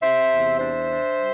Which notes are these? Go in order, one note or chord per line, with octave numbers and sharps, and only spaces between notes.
C3 C5 E5
E2
D4 C5 E5
D4
G3